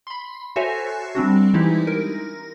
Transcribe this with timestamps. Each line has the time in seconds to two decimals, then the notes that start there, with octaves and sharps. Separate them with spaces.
0.07 B5 C6
0.56 F#4 A4 C5 C#5 E5 G#5
1.15 G3 C4 D4 F#4
1.53 E3 G#3 D#4 E4 G4
1.87 A#4